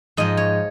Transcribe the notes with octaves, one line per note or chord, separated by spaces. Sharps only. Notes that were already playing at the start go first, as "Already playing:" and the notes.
G#2 F3 D#5
C#5